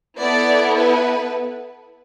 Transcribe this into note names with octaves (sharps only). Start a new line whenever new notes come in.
B3 E4 A4 D5
B4